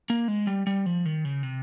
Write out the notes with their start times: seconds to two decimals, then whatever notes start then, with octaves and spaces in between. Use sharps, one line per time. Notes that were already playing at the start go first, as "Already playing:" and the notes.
0.10 A#3
0.28 G#3
0.47 G3
0.67 G3
0.86 F3
1.06 D#3
1.25 C#3
1.43 C3